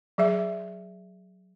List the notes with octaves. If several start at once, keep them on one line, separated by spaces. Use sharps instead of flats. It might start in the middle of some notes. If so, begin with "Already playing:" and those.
F#3 G#4 E5